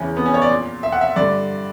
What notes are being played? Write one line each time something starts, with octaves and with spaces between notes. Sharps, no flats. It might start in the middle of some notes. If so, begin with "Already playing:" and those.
Already playing: E2 C#3 E3 C#4
B3
C#4
C#5
D5
A#2
E5
F#5
E5
G2 D3 D5